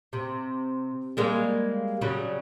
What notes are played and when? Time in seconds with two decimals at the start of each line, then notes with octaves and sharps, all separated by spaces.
0.13 C3
1.17 G3 G#3 A#3
2.01 C#3 F#3 G3